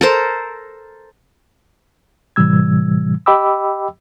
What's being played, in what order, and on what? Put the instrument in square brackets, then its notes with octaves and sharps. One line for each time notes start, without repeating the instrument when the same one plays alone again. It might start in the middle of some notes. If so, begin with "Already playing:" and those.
[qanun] A4 A#4 C5
[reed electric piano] A2 C3 E3 G3 E6 G#6
G4 D#5 G5 B5 D6 E6